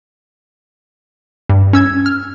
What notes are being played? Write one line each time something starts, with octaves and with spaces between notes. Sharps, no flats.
G2
C#4 E6 G#6
F6